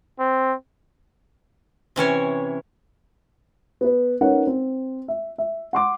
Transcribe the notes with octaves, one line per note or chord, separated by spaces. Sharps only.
C4
C3 E3 C#4 C#5
B3 B4
C#4 D#4 A#4 B4 C#5 F#5
C4
E5
E5
F#5 C6 D6